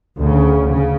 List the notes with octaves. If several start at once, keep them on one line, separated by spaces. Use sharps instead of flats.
D2 C#3
C#3